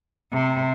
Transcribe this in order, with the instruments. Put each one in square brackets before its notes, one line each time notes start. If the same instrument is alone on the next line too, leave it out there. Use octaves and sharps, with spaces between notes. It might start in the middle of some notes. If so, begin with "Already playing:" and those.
[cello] C3